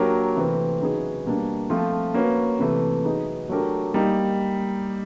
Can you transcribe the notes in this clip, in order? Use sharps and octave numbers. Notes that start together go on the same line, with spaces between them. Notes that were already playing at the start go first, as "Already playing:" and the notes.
Already playing: F#3 A#3 D4 G4 A#4
C3 E3 A3 C4
C#3 F#3 B3 D#4 G#4
B2 G3 A#3 D4
F3 A3 C4 F4
A#3 C#4 F#4 B4
C3 E3 A3
F#3 B3 D#4 G#4
F#3 A3 D4 G4 A#4
G3 A#3 D#4